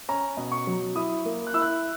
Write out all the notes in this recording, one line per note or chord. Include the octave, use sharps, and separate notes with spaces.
C#4 A#5
B2
C#6
F#3
E4 D#6
A#3
F#6
E4 E6
F#6